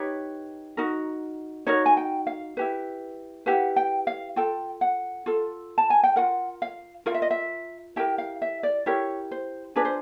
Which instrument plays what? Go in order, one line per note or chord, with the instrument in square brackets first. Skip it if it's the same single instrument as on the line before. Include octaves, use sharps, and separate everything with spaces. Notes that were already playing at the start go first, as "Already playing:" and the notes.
Already playing: [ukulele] D#4 G4 B4 C#5
D#4 F#4 A#4
D#4 F#4 A#4 C#5
G#5
G5
F5
E4 G4 B4
E4 G4 B4 F#5
G5
F5
F4 A4 G5
F#5
F4 A4
A5
G#5
G5
F4 A#4 F#5
F5
F4 A#4 F5
E5
D#5
E5
E4 G4 A#4 G5
F5
E5
D5
E4 G4 A#4 C#5
C5
D4 F4 G#4 B4
C5